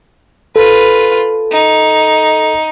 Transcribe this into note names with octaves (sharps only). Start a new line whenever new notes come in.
F4 A4 B4
D#4